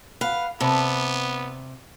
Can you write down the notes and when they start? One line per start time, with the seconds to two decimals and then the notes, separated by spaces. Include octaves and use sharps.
0.21 B4 F5 F#5
0.61 C3 B3 A4 D5 B5